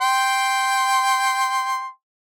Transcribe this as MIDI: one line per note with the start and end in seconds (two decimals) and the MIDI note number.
0.01 1.89 79
0.01 1.89 84